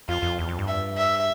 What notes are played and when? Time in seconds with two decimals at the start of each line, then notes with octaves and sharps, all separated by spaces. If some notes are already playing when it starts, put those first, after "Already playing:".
0.08 F2 F4
0.23 F2
0.38 E2
0.49 F2
0.59 G2
0.68 E5
0.98 E5